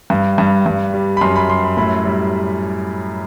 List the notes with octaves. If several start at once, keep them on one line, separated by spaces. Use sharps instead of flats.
G2
G2
G2
G3
B5
F#2 C6
B5
G3 C6
B5
A2 B5
G3